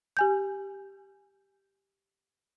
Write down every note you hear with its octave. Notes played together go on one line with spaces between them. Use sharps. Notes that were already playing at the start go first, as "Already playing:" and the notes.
G4 G#5 G6